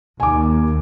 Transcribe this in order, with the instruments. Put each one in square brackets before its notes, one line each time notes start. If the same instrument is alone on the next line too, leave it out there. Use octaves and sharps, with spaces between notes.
[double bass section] D#2 [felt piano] G#5 D6